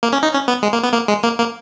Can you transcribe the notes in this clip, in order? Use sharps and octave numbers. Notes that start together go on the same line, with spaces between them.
A#3
C#4
D#4
C#4
B3
G#3
A#3
B3
A#3
G#3
A#3
A#3